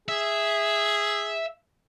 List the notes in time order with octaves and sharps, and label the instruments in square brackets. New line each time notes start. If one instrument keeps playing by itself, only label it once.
[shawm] G#4 [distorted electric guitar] E5